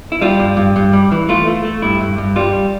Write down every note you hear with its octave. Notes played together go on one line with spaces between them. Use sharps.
E4
G3 F4
G2
G2
G2
G3
E3
A3 F4
A3
A3
G2 E4
G2
G2
G3 F4